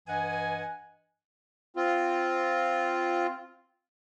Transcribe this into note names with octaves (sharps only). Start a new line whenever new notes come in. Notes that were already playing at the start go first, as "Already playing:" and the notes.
G2 E3 D#5 F#5 G#5
C4 F4